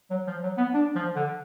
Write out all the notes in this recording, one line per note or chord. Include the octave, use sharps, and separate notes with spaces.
F#3
F3
F#3
B3
D4
F3
D3